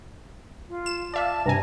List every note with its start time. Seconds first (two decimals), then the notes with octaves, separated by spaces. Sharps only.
0.69 F4
0.86 E7
1.14 D5 E5 F5 A5
1.46 G2 C3 G#5 A#5